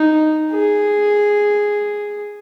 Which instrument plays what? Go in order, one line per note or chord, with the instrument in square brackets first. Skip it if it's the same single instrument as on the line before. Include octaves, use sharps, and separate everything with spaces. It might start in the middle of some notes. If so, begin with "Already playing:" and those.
Already playing: [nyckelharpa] D#4
G#4